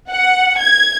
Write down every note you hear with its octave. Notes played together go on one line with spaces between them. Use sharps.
F#5
G#6